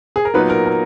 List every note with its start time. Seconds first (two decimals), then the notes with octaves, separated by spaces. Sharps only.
0.16 G#4
0.25 A#4
0.34 A#2 F#3 B3 D#4 B4
0.50 A#4
0.65 A#4